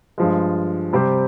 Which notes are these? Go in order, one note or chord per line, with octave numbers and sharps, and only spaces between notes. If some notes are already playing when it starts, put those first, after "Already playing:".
G2 F3 G#3
C3 G3 C4 G4 C5